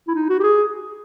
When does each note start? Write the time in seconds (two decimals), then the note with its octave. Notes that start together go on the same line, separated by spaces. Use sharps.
0.08 E4
0.15 D#4
0.29 F#4
0.40 G4
0.43 G#4